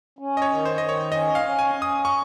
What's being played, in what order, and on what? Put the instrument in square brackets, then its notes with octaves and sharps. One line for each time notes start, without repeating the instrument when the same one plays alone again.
[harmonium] C#4
[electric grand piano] D#5
C#5
[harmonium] D#3
[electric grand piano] C5
[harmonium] D#3 [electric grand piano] D#5
[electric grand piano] C#5
[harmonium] C#4 [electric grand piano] D#5
[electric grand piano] F5
[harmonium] C#4
[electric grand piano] G#5
[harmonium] C#4
[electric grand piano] D#6
C#6